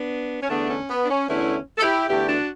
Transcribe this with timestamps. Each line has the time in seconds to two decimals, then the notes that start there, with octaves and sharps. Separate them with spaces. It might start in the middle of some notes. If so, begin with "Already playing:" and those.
Already playing: B3 D4
0.43 C#4
0.49 E2 D3 A3 B3 D4
0.69 C#4
0.89 B3
1.03 D4
1.09 C#4
1.28 E2 D3 A3 C#4 E4
1.78 A4
1.82 E4 G4
2.08 E2 D3 A3 E4 G4
2.28 D4 F#4